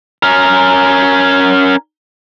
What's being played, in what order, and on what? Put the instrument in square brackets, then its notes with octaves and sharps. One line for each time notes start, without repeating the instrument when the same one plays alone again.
[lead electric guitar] C#4 A#4